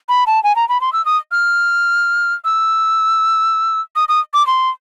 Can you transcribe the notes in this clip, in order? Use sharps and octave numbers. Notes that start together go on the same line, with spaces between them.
B5
A5
G#5
A#5
B5
C6
E6
D#6
F6
E6
D#6
D#6
D6
C6